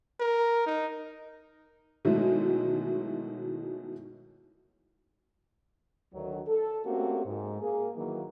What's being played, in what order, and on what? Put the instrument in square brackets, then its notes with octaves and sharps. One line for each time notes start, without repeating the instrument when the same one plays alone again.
[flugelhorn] A#4
D#4
[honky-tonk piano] B2 D#3 E3 F#3 G#3 A3
[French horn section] D2 D#3 F#3
A4
A3 A#3 C4 C#4 F#4 G4
G#2
A#3 G#4
D#3 E3 F#3 A#3